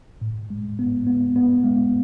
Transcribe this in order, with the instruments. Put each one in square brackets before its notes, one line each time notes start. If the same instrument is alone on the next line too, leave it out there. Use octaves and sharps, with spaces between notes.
[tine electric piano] A2
G#3
B3
B3
B3
G#3